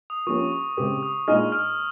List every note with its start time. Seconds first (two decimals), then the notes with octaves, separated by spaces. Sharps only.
0.10 D#6
0.27 F3 A#3 C#4 G4 C#6
0.52 C#6
0.77 C#3 G#3 C4 G4
1.03 D#6
1.28 A#2 G#3 D#4 G#4 D#5 F6
1.52 F6